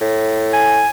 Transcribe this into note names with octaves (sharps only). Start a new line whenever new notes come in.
A2
G#5